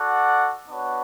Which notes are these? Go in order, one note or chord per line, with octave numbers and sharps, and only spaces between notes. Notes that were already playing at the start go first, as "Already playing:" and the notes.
Already playing: F#4 A4 D5 F#5
B3 D4 F#4 C#5